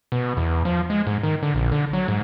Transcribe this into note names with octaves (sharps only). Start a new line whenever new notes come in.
B2
E2
F3
G#3
G#2
D#3
D3
A#1
D3
F#3
G#2